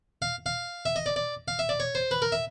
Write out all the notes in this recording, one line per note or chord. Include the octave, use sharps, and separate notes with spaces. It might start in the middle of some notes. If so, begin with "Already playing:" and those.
F5
F5
E5
D#5
D5
D5
F5
E5
D5
C#5
C5
B4
A#4
E5